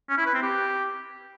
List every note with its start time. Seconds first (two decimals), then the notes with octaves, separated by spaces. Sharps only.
0.09 C#4
0.17 E4
0.26 B4
0.34 C4
0.43 G4